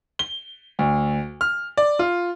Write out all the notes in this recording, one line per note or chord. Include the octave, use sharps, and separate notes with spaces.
G7
D2
F6
D5
F4